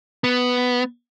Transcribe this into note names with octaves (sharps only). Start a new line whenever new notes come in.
B3